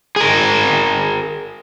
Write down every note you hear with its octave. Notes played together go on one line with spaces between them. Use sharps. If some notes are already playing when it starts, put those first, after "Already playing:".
G#4 A#4